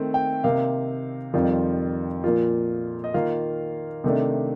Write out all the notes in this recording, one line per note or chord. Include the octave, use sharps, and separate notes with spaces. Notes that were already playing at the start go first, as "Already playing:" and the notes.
Already playing: D#3 A3 C4
G5
C3 D#3 A#3 F5
F2 D#3 G3 C4 F4
A#2 F3 A#3 F4
D#5
D#3 A#3 F4 F5
C3 D#3 A3 D4